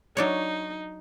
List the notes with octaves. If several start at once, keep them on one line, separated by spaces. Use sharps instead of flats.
F#3 D4 D#4 C#5